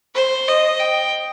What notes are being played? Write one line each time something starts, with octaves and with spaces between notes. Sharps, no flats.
C5
D#5
G5